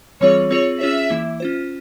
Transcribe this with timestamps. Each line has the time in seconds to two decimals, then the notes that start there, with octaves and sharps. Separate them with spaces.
0.21 E3 G3 C4 F4 G#4 C#5
0.50 C4 F4 G#4 C#5
0.80 C#4 F4 G#4 C#5 E5
1.10 E3 A#3 E4
1.40 C#4 F4 C5